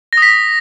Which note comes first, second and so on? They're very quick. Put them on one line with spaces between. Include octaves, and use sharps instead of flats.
A#6 D#6 B6